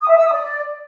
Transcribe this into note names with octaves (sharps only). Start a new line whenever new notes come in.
D#6
E5
E6
D#6
D5